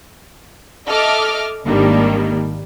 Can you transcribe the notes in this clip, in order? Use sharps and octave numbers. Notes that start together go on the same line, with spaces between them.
A4 D#5 E5 D6 F6
G#1 D#3 G3 A#3 D4